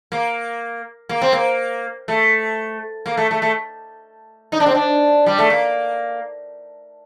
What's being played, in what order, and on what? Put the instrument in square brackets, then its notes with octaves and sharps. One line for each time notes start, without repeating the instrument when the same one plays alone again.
[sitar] A#3
A#3
C4
A#3
A3
A#3
A3
A3
A3
D#4
D4
C4
D4
G3
A3
A#3